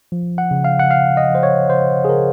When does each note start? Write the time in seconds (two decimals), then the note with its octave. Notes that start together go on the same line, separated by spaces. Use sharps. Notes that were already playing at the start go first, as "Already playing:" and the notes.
0.12 F3
0.38 F#5
0.51 C#3
0.64 F5
0.79 F#5
0.91 C#3 F5
1.17 D#5
1.30 F3 C5
1.43 C#5
1.70 C#3 C5
2.05 G#4
2.09 C#3 A#4